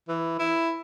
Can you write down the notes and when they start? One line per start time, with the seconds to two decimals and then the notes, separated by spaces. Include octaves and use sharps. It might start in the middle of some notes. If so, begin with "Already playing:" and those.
0.08 E3
0.39 E4